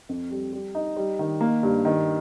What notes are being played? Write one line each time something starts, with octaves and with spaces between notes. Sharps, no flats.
F2
G3
G3
D#4
G3
D#3
A#3
G2
D#3